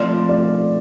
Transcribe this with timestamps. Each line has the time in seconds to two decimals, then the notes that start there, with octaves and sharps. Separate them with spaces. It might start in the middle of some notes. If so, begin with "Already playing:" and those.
Already playing: F3 A3 C4 F4 D5
0.29 D5